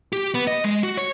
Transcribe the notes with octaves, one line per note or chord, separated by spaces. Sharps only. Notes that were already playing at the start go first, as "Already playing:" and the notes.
G4
B3
D#5
G#3
F#4
C#5